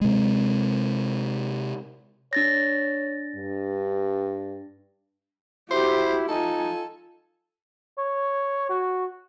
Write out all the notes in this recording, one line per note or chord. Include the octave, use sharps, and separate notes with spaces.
C3 G#3
D4 C#5 A6 A#6
G2
E4 F#4 G4 C5
D#4 F4 A4 G#5
C#5
F#4